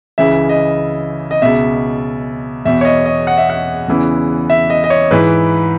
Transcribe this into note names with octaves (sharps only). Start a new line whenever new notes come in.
C#2 C#3 E3 E5
D#5
D#5
C#2 B2 E5
E2 B2 E5
C#5
D#5
D#5
F#5
E5
F#5
E2 C#3 E3
E5
D#5
D#5
C#5
G#2 E3 B4